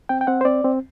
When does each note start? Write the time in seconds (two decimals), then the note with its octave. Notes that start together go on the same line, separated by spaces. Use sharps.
0.09 C4 G5
0.21 G5
0.27 C4 F#5
0.41 C5
0.45 C4 D5
0.64 C4